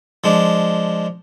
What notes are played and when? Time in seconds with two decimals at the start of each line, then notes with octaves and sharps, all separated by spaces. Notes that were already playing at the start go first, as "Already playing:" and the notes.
0.24 F3 G#3 D4